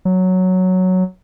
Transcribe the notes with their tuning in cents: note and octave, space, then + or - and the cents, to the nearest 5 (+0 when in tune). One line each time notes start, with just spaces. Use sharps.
F#3 +0